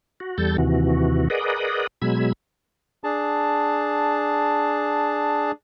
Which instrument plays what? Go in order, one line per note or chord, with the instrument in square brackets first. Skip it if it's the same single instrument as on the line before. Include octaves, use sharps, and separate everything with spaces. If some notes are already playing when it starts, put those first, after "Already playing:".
[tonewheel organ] F#4
E2 G3 A4 G6 A6
D#2 C3 E3 F#4
G#4 A#4 B4 D5 D#5 F#5
B2 F#3 G#3 B5 E6 G#6
[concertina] D4 G#4 A5